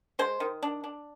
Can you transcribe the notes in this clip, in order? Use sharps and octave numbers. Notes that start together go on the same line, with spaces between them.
G#3 C5
D#3
D4
D4